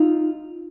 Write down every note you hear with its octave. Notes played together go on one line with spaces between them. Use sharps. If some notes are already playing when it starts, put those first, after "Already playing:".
Already playing: D#4 F4